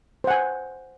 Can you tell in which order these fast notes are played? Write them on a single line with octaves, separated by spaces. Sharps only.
C5 F#5 G#5